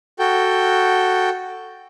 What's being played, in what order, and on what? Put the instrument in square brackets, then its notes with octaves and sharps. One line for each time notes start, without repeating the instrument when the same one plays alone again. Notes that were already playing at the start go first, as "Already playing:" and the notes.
[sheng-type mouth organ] F#4 A4 G5